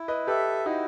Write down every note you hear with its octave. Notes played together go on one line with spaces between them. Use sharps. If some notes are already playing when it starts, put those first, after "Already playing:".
Already playing: E4
B4 D#5
G4 A4 B4 E5
D#4 E4 F#4